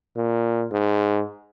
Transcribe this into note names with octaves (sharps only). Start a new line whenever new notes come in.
A#2
G#2